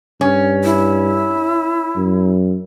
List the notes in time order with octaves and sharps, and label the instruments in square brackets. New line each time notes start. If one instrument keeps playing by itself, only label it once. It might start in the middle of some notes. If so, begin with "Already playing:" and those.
[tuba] G2 [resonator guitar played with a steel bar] C#4
[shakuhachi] E4
[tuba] F#2